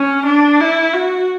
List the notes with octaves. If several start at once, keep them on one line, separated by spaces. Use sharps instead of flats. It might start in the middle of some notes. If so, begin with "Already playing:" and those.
Already playing: C#4
D4
E4
F#4